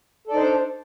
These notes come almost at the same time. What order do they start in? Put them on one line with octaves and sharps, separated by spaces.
A4 D5 D#4 C5 D4